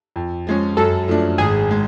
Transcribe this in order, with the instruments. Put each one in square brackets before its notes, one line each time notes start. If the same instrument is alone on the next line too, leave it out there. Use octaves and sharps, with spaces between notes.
[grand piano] F2
F3 G#3 C#4
[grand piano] F#2 [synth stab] A4
[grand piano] F3 A3 D4
[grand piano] G#1 [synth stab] G#4
[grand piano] G#3